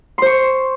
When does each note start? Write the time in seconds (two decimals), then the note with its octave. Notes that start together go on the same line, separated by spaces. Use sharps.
0.18 C6
0.22 C5
0.26 C#6